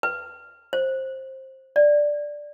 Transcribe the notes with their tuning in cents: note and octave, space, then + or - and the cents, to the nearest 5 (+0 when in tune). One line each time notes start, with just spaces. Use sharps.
B4 +0
C5 +20
D5 +0